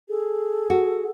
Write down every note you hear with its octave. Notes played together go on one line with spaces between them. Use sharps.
G#4 A4
F#4